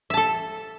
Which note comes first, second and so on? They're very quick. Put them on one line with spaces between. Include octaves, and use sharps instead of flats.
E5 A5 A4